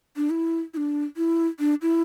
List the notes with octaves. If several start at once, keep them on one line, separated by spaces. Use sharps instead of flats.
D4
E4
E4
D4
E4
D4
E4